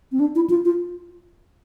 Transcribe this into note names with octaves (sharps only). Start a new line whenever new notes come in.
C4
D4
E4
F4
F4